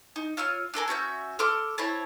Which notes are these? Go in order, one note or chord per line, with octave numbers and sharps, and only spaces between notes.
D#4
F4 C#5 E6 F6
D4 A4 A#4 G#5
C#4 F#4 E5 G6
A4 C6 D6 F6
C4 E4 C#5 A5